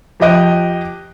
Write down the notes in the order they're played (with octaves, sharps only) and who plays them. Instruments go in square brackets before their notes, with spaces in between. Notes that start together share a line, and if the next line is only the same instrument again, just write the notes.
[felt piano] F2 F3 G4 D#5 F#6 D7